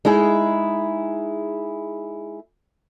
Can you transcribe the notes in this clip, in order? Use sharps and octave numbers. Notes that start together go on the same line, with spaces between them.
G#3 D#4 E4 G#4